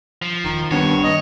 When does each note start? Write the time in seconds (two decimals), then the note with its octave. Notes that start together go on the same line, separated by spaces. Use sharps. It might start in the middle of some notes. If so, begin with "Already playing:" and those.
0.22 F3
0.44 E1 D#3
0.71 G2 D#3 B3 C4 C#5
1.04 D#3 A#3 C4 D#5